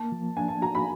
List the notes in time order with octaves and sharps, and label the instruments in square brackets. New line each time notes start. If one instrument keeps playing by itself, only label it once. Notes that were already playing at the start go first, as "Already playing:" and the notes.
Already playing: [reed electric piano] A#3 [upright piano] A5
[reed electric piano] F3
[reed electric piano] D4 [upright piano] G#5
[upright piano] A5
[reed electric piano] F#4 [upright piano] A#5
[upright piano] B5